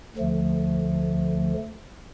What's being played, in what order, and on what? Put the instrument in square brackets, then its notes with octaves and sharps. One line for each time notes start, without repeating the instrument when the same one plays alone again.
[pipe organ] D2 D3 F3 A3